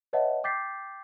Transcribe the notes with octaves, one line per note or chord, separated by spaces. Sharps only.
B4 C#5 D#5 E5 F#5 A5
G5 D6 G6 A6 B6 C7